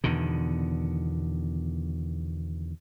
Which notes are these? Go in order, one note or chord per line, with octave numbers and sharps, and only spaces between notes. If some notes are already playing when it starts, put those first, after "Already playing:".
E2 B2 D3 D#3